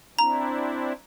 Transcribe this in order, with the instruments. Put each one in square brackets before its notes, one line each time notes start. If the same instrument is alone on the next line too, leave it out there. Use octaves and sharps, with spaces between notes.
[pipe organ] C4 D4 E4 [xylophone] A#5